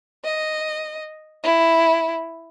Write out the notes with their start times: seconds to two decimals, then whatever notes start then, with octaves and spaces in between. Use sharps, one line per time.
0.25 D#5
1.43 E4